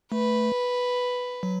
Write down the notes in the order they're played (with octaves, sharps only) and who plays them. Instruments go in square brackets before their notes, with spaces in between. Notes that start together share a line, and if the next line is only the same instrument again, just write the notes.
[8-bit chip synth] A3 [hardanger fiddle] B4
[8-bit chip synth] F#3